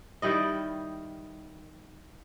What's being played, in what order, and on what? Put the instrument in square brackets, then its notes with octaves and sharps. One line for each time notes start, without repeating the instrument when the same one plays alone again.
[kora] D#3 G3 E4 D#5